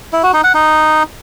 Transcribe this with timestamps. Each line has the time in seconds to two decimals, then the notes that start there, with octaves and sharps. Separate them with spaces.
0.13 E4
0.23 F#4
0.34 D#4
0.44 F#5
0.54 D#4